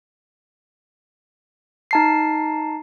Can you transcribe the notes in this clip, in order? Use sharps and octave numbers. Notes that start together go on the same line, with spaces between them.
D#4 A5 C7